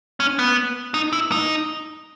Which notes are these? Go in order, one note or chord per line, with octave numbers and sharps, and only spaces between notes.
C#4
B3
D#4
E4
D#4